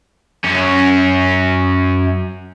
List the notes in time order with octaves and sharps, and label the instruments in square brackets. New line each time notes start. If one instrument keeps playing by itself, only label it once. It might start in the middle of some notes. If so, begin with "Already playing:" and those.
[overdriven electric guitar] F#2 C#4